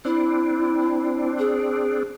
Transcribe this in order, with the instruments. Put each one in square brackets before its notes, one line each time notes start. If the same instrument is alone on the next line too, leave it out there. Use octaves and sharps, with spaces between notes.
[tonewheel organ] C4 D4 [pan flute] E4
[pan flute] G#4